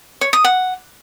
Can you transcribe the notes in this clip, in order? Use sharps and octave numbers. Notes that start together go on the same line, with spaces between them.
C#5
D#6
F#5